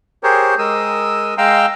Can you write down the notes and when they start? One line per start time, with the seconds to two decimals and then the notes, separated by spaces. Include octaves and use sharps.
0.23 G4 G#4 A#4 C5 C#5
0.59 G#3 A#4 D#6 E6
1.38 G#3 F5 G5 A#5 C6 E6